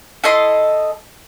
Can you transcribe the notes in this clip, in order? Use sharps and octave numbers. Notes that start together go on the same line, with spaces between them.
E4 A4 D#5 C6